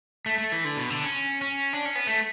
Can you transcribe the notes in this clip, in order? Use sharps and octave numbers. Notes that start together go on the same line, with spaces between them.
A3
A3
E3
D3
B2
D3
C#4
C#4
D4
C#4
B3
A3